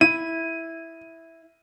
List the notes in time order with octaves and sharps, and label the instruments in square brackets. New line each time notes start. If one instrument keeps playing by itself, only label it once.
[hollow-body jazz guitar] E4 [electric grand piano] D#7